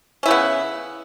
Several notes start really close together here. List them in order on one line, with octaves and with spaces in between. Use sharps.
C#4 E4 C#3 B3